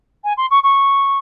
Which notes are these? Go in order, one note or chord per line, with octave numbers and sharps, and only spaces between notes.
G#5
C6
C#6
C#6